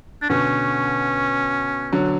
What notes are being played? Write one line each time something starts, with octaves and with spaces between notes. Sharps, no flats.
D4
B2 D3 C#4
D3 F#3